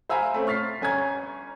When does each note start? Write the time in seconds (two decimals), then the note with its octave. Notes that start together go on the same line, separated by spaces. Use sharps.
0.09 C5 E5 F5 G#5 A#5 B5
0.34 A3 C4 C#4
0.47 C#6 F6 A6 B6 C7
0.81 G1 C#4 G#5 A#5 G#6